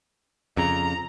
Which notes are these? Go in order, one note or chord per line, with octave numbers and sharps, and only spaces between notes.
F2 C#3 A#5